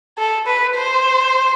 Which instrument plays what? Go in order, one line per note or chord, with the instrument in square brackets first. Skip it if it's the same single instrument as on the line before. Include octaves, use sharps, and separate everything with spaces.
[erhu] A4
B4
C5